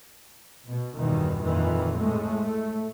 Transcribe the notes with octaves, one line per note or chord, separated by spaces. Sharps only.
B2
E2 G2 B2 D#3 E3
F2 A#2 D#3 E3
A2 G#3 A3
A3